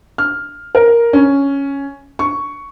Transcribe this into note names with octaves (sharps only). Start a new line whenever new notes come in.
F6
A#4
C#4
C#6